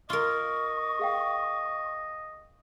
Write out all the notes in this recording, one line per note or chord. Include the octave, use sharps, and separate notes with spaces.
F4 A#4 D#5 C#6
G#4 F5 G5